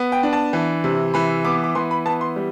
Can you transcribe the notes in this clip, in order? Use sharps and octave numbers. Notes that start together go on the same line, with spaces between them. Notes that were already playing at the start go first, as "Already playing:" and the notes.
Already playing: B3
G5
D4
A5
E3
C3
E3 B5
B3 D6
D6
E3 C6
B5
B3 A5
C6
G3